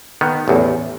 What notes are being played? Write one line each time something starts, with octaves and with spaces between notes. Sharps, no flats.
D#3 B3
A1 E2